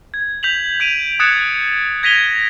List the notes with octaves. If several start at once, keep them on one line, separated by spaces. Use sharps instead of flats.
G#6
G6 B6 F7 F#7
G6 D7 D#7 F7
D#6 F#6 G#6 A6 C#7 E7
G#6 A#6 B6 D#7 F7 G7